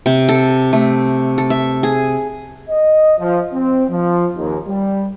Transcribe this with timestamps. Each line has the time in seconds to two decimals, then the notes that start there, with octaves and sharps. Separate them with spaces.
0.06 C3
0.29 A4
0.73 A3
1.38 A4
1.50 E5
1.83 G#4
2.69 D#5
3.19 F3
3.53 C4
3.90 F3
4.37 D#2
4.68 G3